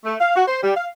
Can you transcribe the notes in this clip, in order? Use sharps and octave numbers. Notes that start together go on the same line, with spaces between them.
A3
F5
F#4
C5
G3
F5